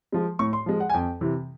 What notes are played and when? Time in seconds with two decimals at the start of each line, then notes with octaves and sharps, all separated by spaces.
0.12 F3 G#3
0.39 A2 C#6
0.53 C6
0.66 F3 G#3
0.80 F#5
0.90 G#5
0.93 F2 G5
1.21 C3 E3